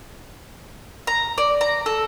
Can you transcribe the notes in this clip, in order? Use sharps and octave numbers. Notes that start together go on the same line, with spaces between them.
A#5
D5
A#5
A4